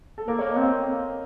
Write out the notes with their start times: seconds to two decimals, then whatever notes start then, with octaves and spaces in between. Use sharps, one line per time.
0.18 A4
0.27 A#3 A#4
0.39 A#3 C#5
0.50 D#5
0.57 C4 F5